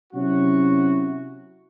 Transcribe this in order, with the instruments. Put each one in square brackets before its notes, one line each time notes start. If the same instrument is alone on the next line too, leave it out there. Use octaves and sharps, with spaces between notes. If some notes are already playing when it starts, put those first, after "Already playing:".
[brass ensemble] C3 F#3 C#4 E4 F#4